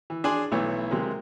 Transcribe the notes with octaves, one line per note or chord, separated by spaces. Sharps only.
E3
D4 G#4 D5 G#5 C6
B1 E3 A3 B3 C#5
C3 F#3 G#3 A#3